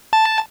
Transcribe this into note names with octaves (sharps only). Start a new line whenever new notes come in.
A5